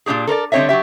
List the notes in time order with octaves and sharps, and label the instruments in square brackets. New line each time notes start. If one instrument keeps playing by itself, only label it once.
[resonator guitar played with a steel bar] A#2 C4 D4 G4 G#4
A4 A#4 C5 D5
D3 G3 C4 C#5 D#5 E5
F#3 D4 G4 E5